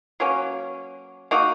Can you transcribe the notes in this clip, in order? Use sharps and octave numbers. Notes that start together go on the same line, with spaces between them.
F#3 A#3 C#4
A#3 D#4 F#4